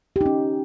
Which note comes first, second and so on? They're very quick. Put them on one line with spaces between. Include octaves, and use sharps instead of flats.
G4 D#4 C#4